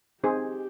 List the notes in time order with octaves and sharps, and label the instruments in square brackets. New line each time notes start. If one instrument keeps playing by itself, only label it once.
[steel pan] C4 D#4 G#4 C5 [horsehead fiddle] G4